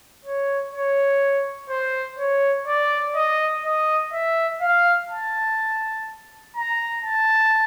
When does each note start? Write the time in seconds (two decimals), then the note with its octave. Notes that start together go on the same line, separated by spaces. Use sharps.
0.25 C#5
0.74 C#5
1.70 C5
2.19 C#5
2.68 D5
3.16 D#5
3.65 D#5
4.13 E5
4.61 F5
5.10 A5
6.57 A#5
7.05 A5